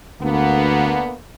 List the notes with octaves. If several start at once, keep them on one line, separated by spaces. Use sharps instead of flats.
D2 D3 A#3 B3